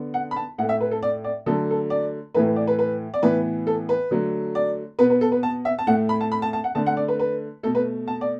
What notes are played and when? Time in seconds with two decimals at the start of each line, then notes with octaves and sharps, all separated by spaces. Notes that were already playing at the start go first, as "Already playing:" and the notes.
Already playing: D3 B3
0.14 F#5
0.31 B5
0.36 A5
0.58 A2 F#5
0.62 A3
0.69 E5
0.81 B4
0.91 A4
1.03 D5
1.24 D5
1.46 D3 F#3 A3 A4
1.71 A4
1.90 D5
2.34 A2 E3 A3 B4
2.46 B4
2.56 D5
2.67 B4
2.79 B4
3.14 D5
3.22 A2 E3 B3 B4
3.67 A4
3.89 B4
4.11 D3 F#3 A3
4.55 D5
4.99 B2 B3 B4
5.10 B4
5.21 A4
5.32 B4
5.43 A5
5.65 E5
5.79 A5
5.87 A2 A3 F#5
6.09 B5
6.21 A5
6.32 B5
6.42 A5
6.53 A5
6.64 F#5
6.75 D3 A3 A5
6.86 F#5
6.97 D5
7.08 B4
7.19 B4
7.63 B2 A3 A4
7.75 B4
8.08 A5
8.21 D5